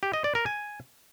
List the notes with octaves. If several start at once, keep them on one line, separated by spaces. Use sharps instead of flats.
G4
D#5
D5
A#4
G#5